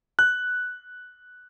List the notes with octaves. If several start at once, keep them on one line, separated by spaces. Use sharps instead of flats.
F#6